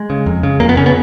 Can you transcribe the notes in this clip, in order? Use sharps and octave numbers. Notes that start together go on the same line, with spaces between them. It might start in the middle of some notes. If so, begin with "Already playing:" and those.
Already playing: G#3
C#3
F2
C#3
F2 A#3
B3
C#3 C#4
B3